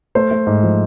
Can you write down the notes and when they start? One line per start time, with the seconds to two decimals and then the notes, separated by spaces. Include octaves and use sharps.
0.15 A3 C5
0.31 A3
0.47 G#2
0.63 F3